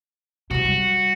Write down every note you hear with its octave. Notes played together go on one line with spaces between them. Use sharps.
C3 G3 F#4
G3